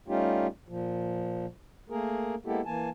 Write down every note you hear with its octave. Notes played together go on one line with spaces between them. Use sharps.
G3 A3 C#4 D#4 F4 G4
A#2 F3
A3 A#3 G#4 A#4
G#3 A#3 B3 E4 G4 A4
E3 A#3 G#5 A5